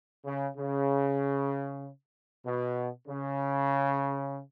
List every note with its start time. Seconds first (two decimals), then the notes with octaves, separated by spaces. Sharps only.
0.25 C#3
0.56 C#3
2.45 B2
3.08 C#3